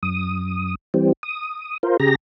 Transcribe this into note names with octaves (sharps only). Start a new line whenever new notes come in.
F#2 D#6
E3 G3 C4
D#6
F4 A#4 C5
C#3 G4 G#4 A#5 A#6